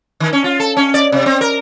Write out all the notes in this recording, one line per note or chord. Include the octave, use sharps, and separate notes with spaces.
D#3
C#4
F4
A4
C#4
D5
C3
C4
A#4